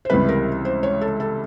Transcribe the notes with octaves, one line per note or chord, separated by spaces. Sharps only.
C5
C#2 C3 E3 G3 B4
A#4
C5
C#5
A4
A4